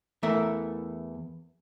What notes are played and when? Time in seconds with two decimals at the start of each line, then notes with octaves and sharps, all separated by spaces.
0.23 E2 E3 A3 A#4 E5